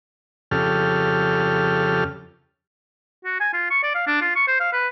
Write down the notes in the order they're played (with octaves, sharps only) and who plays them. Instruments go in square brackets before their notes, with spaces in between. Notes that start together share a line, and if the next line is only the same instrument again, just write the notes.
[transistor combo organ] F2 C#3 G4 A4 F6
[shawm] F#4
G#5
F4
C#6
D5
F5
D4
F4
C#6
C5
F5
B4